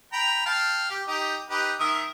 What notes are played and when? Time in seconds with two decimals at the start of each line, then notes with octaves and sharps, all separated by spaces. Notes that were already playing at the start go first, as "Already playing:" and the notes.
0.13 G5 A#5 B5
0.46 F5 G5 A5
0.90 G4
1.08 D#4 G4
1.50 D#4 G4 B4
1.80 D#3 E5 D#6